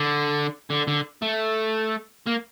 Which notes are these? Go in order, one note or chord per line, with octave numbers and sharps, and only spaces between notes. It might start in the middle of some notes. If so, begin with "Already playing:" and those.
Already playing: D3
D3
D3
A3
A#3